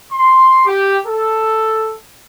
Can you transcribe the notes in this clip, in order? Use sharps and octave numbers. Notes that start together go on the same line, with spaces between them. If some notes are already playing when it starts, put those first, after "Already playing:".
C6
G4
A4